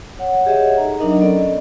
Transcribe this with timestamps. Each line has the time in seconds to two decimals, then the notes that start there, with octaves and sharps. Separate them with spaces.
0.19 C#5 F#5
0.46 G4 G#4 C#5 D#5 E5 F#5
0.77 D#4 A4 A#5
0.98 F#3 D4 D#4 A#4 D#5 A#5
1.21 B3 C#4 A4 D5 D#5